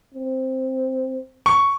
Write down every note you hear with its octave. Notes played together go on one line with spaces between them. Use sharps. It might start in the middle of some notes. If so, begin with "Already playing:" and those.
C4
C#6